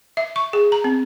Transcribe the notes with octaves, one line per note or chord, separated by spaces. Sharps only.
E5
C#6
G#4
A#5
C4